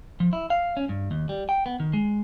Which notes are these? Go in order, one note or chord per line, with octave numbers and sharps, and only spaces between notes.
F3
E4
F5
C#4
G2
D#2
G3
G5
B3
D#3
G#3